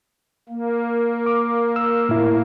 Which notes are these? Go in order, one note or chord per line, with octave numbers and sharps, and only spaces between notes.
A#3
D6
E6
A2 E4